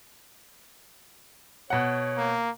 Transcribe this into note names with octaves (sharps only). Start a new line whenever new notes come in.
B2 C#5 F#5
A#3